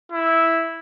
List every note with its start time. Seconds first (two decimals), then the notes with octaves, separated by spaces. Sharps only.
0.12 E4